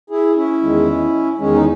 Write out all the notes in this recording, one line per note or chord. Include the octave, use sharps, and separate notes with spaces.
E4 G#4
C#4 E4
E2 D#3 G#3
E2 D#3 G#3 C#4
D#4